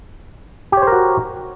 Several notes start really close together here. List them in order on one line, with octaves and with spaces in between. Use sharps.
G4 C#5 C5 A#4 F#4